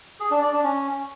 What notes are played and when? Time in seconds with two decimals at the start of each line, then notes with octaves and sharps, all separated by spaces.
0.20 G#4
0.31 D4
0.42 D5
0.53 D4
0.64 C#4